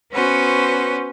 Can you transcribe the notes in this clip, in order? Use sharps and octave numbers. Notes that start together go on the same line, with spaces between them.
B3 C#4 F#4 B4 C5